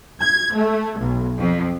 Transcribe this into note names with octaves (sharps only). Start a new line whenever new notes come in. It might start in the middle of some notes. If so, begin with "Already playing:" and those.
G#6
A3
B1
F2